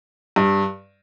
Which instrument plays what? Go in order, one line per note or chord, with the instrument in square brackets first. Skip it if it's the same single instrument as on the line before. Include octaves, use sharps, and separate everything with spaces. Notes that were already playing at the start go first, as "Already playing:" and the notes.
[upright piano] G2